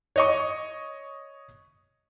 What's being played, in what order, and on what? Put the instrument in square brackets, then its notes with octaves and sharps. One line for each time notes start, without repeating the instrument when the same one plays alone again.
[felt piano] C#5 D#5 C#6